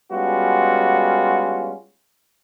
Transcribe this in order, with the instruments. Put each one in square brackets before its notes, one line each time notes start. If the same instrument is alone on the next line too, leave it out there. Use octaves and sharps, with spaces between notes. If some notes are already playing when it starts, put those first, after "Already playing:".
[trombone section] G3 G#3 B3 C#4 F4 F#4